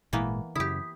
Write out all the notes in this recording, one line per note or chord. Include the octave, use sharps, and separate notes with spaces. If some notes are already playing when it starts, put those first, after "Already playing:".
G#1 A#2 E3 G#3 A#3 B3
F#2 C#3 E4 G4 D#6 B6